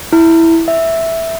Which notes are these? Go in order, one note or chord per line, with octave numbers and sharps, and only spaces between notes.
E4
E5